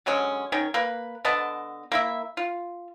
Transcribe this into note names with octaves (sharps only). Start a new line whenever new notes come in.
D3 F#3 G#3 C#4
D#3 C#4 C#5
A#3 B4
D3 B3 D#5 A5
A#3 E4 E5
F4